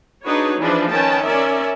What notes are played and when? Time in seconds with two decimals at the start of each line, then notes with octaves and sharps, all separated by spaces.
0.24 D4 D#4 F#4 G#4 B4 C#5
0.60 E3 F3 D4 G#4 B4 D5
0.90 D#3 C#4 B4 G5 A5
1.25 C#4 A#4 D5 E5